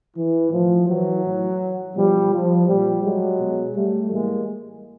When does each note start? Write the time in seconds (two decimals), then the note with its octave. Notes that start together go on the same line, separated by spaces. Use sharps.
0.17 E3
0.51 A2 E3 F3
0.88 E3 F#3
1.24 A2 E3
1.95 B2 F3 G3
2.32 F3
2.67 A#2 F3 G3
3.04 F#3 G#3
3.39 B2
3.76 G3 A3
4.11 A2 E3 G#3 A#3